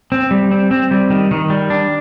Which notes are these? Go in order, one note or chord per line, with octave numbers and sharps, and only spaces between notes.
C4
G3
C4
C4
G3
D#3
D#3
G3
D4